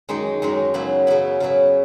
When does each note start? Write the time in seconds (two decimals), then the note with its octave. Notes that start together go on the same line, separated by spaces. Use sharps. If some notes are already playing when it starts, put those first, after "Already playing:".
0.09 F#2 D#3 G#3 D#4
0.42 F#2 D#3 G#3 D#4
0.74 C#3 F#3 B3 E4
1.07 C#3 F#3 B3 E4
1.40 C#3 F#3 B3 E4